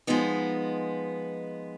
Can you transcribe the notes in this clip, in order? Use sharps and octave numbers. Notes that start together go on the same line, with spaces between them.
F3 G#3 B3 D#4